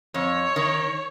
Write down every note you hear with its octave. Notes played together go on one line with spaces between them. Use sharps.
F2 C#5
D#3